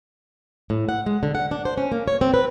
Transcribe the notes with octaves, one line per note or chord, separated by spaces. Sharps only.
A2
F#5
G#3
D3
F#5
D4
C5
C#4
A#3
C#5
C4
B4